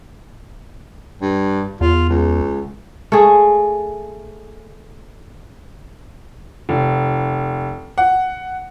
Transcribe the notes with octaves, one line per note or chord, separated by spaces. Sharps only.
G2
E2 F4
C#2
A3 G#4
F1
F#5